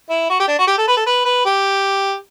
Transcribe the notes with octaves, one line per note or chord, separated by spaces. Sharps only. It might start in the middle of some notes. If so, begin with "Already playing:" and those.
E4
F#4
G4
D4
F#4
G4
A4
B4
A4
B4
B4
G4